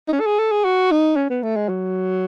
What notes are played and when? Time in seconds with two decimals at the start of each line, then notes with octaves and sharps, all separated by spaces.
0.08 D#4
0.13 C#4
0.20 A4
0.26 G#4
0.39 A4
0.52 G#4
0.65 F#4
0.91 D#4
1.16 C#4
1.30 B3
1.43 A3
1.56 G#3
1.69 F#3